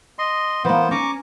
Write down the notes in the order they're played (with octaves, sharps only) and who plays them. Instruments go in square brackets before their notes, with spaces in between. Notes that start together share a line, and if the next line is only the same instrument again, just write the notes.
[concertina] D#5 C6
[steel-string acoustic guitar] E3 A#3 [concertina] B3 C5
[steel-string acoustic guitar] C#4 G#5 [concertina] A#5 C#6 D6